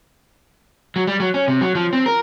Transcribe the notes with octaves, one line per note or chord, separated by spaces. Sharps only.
F#3
G3
F#3
C#4
C3
F#3
F3
C4
A#4